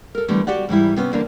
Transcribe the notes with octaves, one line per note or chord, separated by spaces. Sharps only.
A4 A#4
D3 E3 G3 A3 B3
F#4 G4 D5 F#5
G#2 E3 G3 E4
C3 B3 C#4
E2 D3 A#3 D4